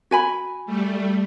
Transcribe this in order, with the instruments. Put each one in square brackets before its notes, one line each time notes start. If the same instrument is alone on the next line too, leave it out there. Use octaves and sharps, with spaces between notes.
[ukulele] F#4 G#5 B5
[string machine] G3 A3